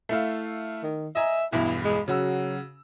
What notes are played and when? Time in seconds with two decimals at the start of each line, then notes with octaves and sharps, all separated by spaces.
0.09 A3 E4 F5
0.83 D#3
1.15 D#5 E5 G#5 A#5
1.52 B1 E2 G2 E4
1.85 G#3
2.08 C#3 F#3 F#4 E6